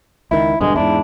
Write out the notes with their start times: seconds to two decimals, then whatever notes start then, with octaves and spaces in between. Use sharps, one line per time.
0.31 C#2 D#3 E4
0.61 E1 G2 B2 D3 G#3
0.76 E2 G#2 D4 E4